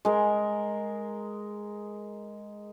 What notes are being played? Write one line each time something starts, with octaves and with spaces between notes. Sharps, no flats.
G#3 A#4